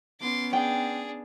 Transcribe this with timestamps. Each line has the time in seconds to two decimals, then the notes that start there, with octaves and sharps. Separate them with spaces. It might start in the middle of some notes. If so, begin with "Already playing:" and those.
0.21 B3 C#4 C6 D6
0.53 D4 G#4 G5